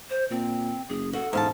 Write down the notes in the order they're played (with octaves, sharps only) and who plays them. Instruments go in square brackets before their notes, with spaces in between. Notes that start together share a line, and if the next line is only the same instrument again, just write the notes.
[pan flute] C5
[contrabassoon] A#2 [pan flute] C4
[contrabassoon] F#1 [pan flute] G#4
[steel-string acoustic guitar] F#4 [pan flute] A4
[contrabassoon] E1 [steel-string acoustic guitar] G#2 F5 A5